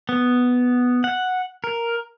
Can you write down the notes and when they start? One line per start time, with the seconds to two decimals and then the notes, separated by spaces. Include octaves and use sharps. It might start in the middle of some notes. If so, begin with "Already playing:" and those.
0.09 B3
1.04 F#5
1.64 A#4